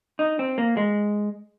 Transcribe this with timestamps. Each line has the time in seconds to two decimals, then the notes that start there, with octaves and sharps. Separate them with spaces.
0.19 D#4
0.39 C4
0.58 A#3
0.77 G#3